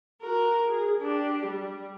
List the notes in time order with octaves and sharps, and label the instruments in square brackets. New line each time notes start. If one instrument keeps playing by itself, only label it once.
[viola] F#4 A#4
G#4
D4 G4
G3